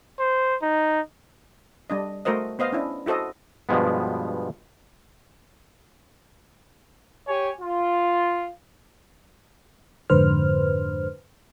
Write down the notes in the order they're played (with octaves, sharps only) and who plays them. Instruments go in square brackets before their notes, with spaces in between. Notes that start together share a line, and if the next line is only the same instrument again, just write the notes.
[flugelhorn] C5
D#4
[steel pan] G3 D4 D#5
A3 F#4 A#4 C5 D#5
B3 C5 D#5 F5
C#4 D4 E4
E4 F#4 A4 C5 D#5
[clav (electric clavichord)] G2 B2 F3 G#3 B3
[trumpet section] G4 C#5 G#5
F4
[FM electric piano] F2 G#2 D3 B4 C5 F6